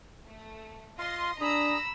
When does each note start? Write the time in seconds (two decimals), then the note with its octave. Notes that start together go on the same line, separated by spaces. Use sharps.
0.25 A3
0.99 F4 D#5 F5 C6
1.41 D4 G#4 A#5 B5 E6